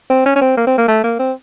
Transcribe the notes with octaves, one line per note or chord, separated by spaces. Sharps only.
C4
C#4
C#4
C4
A#3
C4
A#3
A3
A#3
C4